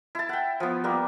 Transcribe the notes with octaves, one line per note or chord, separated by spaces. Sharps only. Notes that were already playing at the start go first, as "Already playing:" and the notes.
E4 A5
F#5 G5
F3 B3
G3 A#3 B3